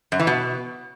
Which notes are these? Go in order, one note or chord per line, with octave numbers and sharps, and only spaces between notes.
F#2
E3
B2